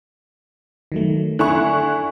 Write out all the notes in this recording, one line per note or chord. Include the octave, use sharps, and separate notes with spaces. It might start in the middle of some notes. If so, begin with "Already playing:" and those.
D#3 F#3 A3
D3 E4 G#5 C#6 F#6